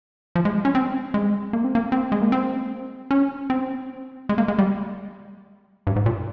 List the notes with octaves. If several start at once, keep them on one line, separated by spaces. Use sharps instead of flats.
F3
G#3
C#4
C4
G#3
A#3
C4
A#3
C4
G#3
A#3
C4
C#4
C4
G#3
A#3
G#3
G3
G2
G#2
A#2